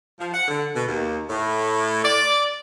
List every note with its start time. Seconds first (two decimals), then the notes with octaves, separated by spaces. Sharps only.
0.19 F3
0.33 F#5
0.48 D3
0.74 B2
0.87 D#2
1.29 A2
2.03 D5